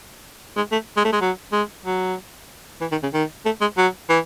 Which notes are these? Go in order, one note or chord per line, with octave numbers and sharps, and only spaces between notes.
G#3
A3
G#3
A3
G#3
F#3
G#3
F#3
E3
D#3
C#3
D#3
A3
G#3
F#3
E3